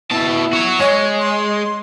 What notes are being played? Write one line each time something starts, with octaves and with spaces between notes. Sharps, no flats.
B2 E4 A5
F#4 C#5
G#3 C#5
C6